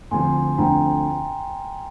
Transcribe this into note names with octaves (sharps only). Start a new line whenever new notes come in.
D2 D3 F3 C4 G#5 C6
D2 D3 F3 C4 G5 A#5